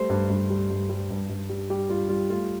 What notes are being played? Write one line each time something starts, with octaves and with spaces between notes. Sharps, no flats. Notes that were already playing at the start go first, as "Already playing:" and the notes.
Already playing: G3 A3 C5
G2
G2
G3
G2
G3
G2
G2
G3
G3 G4
G3 F4
G3 F4
A3 F4